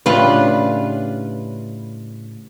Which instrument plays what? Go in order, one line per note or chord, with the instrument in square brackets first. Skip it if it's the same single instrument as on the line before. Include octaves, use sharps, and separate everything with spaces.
[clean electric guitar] A2 [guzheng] C#3 G3 D4 [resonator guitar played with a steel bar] F4 B4